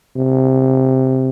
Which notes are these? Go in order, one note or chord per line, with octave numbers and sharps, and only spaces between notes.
C3